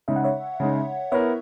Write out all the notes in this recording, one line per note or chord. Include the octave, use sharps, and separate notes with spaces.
C#3 G#3 D#4 E5
F#5
C#5 E5
C#3 G#3 D#4
B3 E4 A#4 C#5 E5